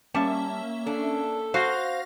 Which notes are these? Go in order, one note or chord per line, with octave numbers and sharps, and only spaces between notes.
G3 A#3 C#4 E5 A5
D4 A4
F#4 C5 F5 A#6